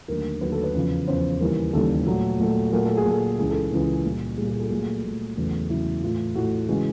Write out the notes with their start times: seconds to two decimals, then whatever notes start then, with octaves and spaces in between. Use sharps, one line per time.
0.08 D#2 D3 F#3 A3 A#4
0.41 D#2 D3 F#3 A3 B4
0.52 A4
0.63 B4
0.74 E2 C#3 F3
1.07 E2 C#3 F3 C5
1.40 D#2 C#3 E3 G3 A#4
1.73 D#2 C#3 E3 G3 A4
2.06 A#2 F#3 A3
2.39 A#2 F#3 A3
2.72 A#2 F#3 A3 A#4
2.85 A4
2.97 G#4
3.05 A#2 F#3 A3 A4
3.38 C#2 C#3 E3 G#4
3.50 A4
3.71 C#2 C#3 E3
4.05 A#2 G3
4.37 G3 G#4
4.41 A#2
4.49 G#4
4.59 A4
4.70 A#2 F#3 A3 G#4
5.03 A#2 F#3 A3
5.37 E2 C#3 F#3 A3
5.70 E2 C#3 F#3 A3 E4
6.02 A2 E3 A3 F4
6.36 A2 E3 A3 F#4
6.69 C#3 E3 G#3 F#4